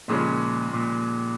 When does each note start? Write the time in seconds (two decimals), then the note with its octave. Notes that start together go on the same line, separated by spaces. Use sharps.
0.08 D#2 A#2 C#3 F3 G#3 C#4
0.73 A#2